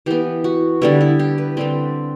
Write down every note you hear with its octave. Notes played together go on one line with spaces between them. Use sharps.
E3 B3 G4
F#4
D3 G3 B3 E4
E4
G4
B4
D3 G3 C4